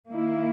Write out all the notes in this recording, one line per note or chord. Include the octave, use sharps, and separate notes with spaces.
D#3 A#3 E4